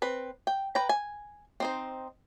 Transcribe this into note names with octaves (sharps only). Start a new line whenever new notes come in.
C4 B4
G5
B4 G5 A#5
G#5
C4 D#4 C5